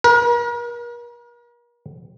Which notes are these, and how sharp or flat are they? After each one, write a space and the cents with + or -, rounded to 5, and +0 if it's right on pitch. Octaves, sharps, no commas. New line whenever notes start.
A#4 +40